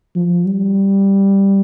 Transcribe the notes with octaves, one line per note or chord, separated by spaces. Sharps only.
F3
G3